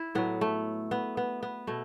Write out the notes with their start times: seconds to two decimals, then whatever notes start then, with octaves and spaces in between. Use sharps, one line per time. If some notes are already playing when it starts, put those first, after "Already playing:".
Already playing: E4
0.15 A2 F#3 B3
0.41 A3
0.91 B3
1.17 B3
1.43 B3
1.67 B2 A3